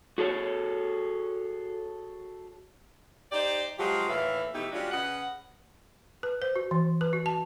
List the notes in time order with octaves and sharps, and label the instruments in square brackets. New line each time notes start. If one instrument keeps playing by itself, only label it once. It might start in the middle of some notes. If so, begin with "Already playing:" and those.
[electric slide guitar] F#4 G#4 A4 C#5
[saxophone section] D#4 G4 C5 D5
F3 F#3 G#3 F4 G4
D#2 A2 E3 B4 E5 F5
B2 E3 A3 D#4 E4 G4
G3 G#3 C#4 D4 F4 F#4
C#3 B4 D#5 F#5
[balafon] B4
C5
F#4
E3
B4
F#4
A5